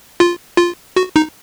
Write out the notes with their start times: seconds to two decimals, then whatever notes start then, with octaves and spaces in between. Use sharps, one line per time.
0.20 F4
0.57 F4
0.96 F#4
1.16 D#4